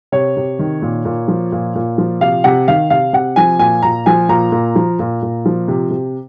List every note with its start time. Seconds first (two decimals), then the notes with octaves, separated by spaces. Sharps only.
0.12 C3 C#5
0.37 C3
0.59 D#3
0.82 A#2
1.05 A#2
1.28 F3
1.52 A#2
1.75 A#2
1.98 F3
2.21 C3 F5
2.44 C3 F#5
2.68 D#3 F5
2.90 C3 F5
3.13 C3 F#5
3.36 F3 G#5
3.59 A#2 G#5
3.82 A#2 A#5
4.06 F3 G#5
4.29 A#2 A#5
4.52 A#2
4.76 F3
4.99 A#2
5.22 A#2
5.46 F3
5.68 C3
5.91 C3